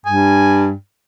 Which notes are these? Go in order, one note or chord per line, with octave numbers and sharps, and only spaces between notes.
G2 G#5